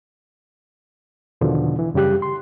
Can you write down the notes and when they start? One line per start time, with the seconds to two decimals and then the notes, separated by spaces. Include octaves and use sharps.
1.41 E2 B2 D3 D#3 F3
1.79 E3
1.94 F#2 C#3 G3 G4 F#6
2.22 C6